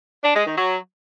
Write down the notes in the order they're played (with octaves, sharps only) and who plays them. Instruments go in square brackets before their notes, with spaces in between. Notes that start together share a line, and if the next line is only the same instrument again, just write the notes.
[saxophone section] D4
G#3
D#3
F#3